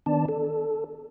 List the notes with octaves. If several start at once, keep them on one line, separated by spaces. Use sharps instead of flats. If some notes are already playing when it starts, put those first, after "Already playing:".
D#3 B3 D4 D5 A5
A4